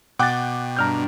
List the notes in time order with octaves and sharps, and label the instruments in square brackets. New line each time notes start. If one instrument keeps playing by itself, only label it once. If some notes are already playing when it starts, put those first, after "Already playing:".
[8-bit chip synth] B2 [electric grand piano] F#5 A6 [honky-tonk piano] G5 D6 F#6
[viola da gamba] G2 D4 [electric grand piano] A#5 F6 G6